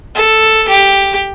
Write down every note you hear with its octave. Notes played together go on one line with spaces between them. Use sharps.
A4
G4